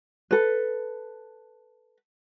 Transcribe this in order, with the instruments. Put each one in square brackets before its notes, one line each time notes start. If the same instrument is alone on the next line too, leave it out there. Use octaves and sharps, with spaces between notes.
[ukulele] A4 B4